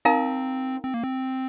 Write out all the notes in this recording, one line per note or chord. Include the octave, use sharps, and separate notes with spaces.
C4 D#4 A#4 F5 A#5
C4
A#3
C4